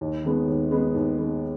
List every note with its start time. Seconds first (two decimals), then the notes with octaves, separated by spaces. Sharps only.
0.01 D#2
0.24 D#3 G#3 B3
0.48 D#2
0.71 D#3 G#3 B3
0.94 D#2
1.18 D#3 G#3 B3